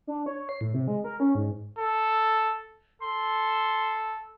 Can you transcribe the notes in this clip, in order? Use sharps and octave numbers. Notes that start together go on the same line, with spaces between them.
D4
C#5
C7
A2
C3
G#3
A#4
C#4
G#2
A4
A4 C6